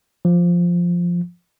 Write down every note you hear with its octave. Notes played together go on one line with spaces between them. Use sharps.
F3